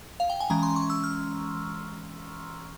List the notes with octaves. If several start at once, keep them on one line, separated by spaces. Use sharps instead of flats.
F5
G5
G#5
E3 G#3 C#4 A#5
C6
C#6
E6
F6